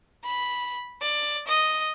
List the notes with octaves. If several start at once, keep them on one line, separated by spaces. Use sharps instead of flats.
B5
D5
D#5